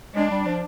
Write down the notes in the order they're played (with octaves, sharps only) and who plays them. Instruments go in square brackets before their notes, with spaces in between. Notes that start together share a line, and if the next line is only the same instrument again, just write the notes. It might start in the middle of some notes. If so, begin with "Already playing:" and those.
[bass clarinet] G#3 [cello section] D4
[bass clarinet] G3
F3